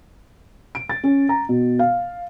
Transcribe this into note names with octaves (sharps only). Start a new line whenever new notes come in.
D7
A6
C#4
A#5
B2
F5